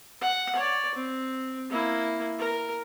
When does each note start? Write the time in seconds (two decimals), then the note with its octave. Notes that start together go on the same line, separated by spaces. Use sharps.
0.21 F#5
0.56 C#5 D5
0.95 C4
1.70 A#3 E4
2.38 A#4